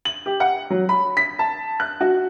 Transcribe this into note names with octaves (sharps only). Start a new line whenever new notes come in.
F#7
G4
F#5
F#3
B5
B6
A5
F#6
F#4